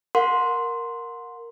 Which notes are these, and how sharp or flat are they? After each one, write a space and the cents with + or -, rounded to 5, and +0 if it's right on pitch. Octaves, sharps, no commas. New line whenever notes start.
A#4 +0 F#5 -30 C6 +0